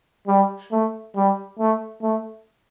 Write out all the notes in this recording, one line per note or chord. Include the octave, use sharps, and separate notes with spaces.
G3
A3
G3
A3
A3